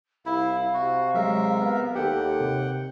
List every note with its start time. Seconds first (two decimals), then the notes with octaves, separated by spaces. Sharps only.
0.26 C2 E4 F5
0.74 C3 F#4
1.15 F#3 G#3 A#4 E5
1.62 B3
1.95 D#2 G4 A4 F#5 G5
2.40 C3